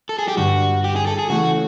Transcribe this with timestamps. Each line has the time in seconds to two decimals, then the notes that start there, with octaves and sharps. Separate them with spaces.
0.09 A4
0.19 G#4
0.28 G4
0.37 G2 D3 G3 F#4
0.84 G4
0.96 G#4
1.07 A4
1.19 G#4
1.30 C#3 E3 A3 F#4